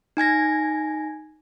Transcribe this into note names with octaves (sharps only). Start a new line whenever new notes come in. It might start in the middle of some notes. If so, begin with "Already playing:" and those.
D#4 G#5 G#6 A#6